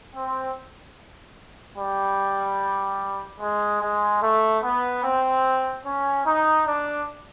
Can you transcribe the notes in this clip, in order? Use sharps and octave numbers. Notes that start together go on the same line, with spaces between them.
C4
G3
G#3
G#3
A3
B3
C4
C#4
D#4
D4